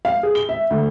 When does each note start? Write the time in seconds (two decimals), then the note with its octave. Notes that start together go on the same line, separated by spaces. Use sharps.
0.05 F5
0.23 G#4
0.35 G7
0.49 E5
0.70 D2